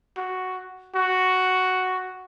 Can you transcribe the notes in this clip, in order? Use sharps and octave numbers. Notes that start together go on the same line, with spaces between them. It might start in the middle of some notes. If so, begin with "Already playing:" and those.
F#4
F#4